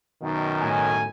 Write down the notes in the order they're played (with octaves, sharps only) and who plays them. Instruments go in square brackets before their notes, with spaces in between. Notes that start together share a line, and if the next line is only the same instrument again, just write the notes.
[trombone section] F#2 B2 D#3
[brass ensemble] A2 G#5